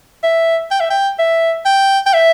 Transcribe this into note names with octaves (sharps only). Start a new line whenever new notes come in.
E5
G5
E5
G5
E5
G5
G5
E5